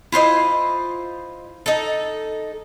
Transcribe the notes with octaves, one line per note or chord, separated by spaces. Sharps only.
E4 F4 C5 D#5
D#4 A4